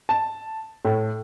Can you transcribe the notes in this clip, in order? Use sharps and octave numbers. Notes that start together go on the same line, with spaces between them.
A5
A2